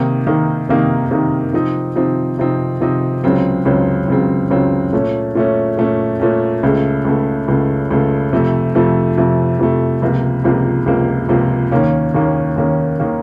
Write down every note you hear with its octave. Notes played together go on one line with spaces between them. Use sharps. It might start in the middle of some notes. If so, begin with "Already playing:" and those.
Already playing: C3 D#3 A#3 D#4
C3 D#3 A#3 D#4
C3 D#3 A#3 D#4
C3 D#3 A#3 D#4
C3 F3 C4 D#4
C3 F3 C4 D#4
C3 F3 C4 D#4
C3 F3 C4 D#4
C#2 C#3 F#3 C4
C#2 C#3 F#3 C4
C#2 C#3 F#3 C4
C#2 C#3 F#3 C4
A#2 A3 C#4
A#2 A3 C#4
A#2 A3 C#4
A#2 A3 C#4
C#2 C#3 A3
C#2 C#3 A3
C#2 C#3 A3
C#2 C#3 A3
F2 C3 F3 A3
F2 C3 F3 A3
F2 C3 F3 A3
F2 C3 F3 A3
C#2 C3 F3 A#3
C#2 C3 F3 A#3
C#2 C3 F3 A#3
C#2 C3 F3 A#3
D#2 D#3 A#3 C#4
D#2 D#3 A#3 C#4
D#2 D#3 A#3 C#4
D#3 A#3 C#4